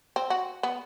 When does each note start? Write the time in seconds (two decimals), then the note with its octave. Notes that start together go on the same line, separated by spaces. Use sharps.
0.16 C4
0.30 F#4
0.63 B3